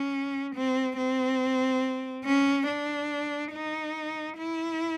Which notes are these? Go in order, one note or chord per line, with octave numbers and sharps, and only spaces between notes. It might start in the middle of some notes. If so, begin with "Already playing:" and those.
Already playing: C#4
C4
C4
C#4
D4
D#4
E4